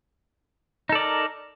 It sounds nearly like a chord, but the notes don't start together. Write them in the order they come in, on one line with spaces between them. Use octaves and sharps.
D#4 A4 D5 A#4